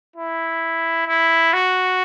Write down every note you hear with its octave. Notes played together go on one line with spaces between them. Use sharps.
E4
E4
F#4